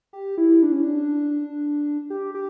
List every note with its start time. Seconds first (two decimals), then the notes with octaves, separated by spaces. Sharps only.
0.13 G4
0.38 E4
0.63 D4
0.72 C#4
0.83 D4
2.10 G4
2.35 G4